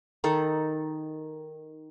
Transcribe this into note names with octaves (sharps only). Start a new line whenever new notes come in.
D#3 D#4 A4